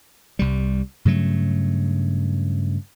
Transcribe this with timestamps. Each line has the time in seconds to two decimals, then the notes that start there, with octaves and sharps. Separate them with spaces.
0.39 C2 G3
1.05 G2 C#3 F#3 A3